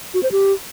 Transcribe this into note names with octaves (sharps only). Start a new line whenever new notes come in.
F#4
C5
G4